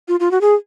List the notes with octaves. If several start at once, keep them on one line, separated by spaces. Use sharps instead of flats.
F4
F4
F#4
G#4